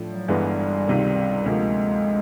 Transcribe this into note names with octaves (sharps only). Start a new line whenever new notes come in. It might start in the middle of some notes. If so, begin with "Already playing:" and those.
Already playing: A2 F3 A3 D4
F#3
G1 G2 E3 G3 G#3 B3
C#2 C3 D#3
D2 C3 F3 G#3 A#3